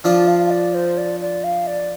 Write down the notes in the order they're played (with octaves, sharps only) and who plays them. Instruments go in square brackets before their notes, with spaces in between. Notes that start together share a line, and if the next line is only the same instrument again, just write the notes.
[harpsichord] F3 D4 F4 [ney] D5
[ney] F5
F5
D5
C5
D5
D5
F5
D5